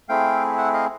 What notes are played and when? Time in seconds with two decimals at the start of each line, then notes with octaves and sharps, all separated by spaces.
0.09 A3 C4 E4 G#4 F5 G5
0.58 E5 F#5
0.74 D#5 F5